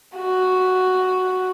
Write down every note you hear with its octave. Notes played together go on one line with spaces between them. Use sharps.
F#4